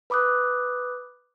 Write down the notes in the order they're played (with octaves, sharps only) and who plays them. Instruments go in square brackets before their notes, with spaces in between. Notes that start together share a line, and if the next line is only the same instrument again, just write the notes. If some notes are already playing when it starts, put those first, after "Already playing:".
[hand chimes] B4 B5 D6 D#6 F#6